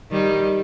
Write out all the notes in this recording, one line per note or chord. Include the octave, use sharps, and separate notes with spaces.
D#3 G3